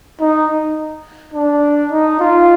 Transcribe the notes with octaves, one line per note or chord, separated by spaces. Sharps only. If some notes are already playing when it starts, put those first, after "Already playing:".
D#4
D4
D#4
F4